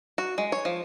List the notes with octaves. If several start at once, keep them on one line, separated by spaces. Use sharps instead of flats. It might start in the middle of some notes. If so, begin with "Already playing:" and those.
F#4
G#3
C#5
F3